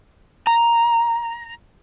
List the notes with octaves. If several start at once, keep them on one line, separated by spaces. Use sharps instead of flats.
A#5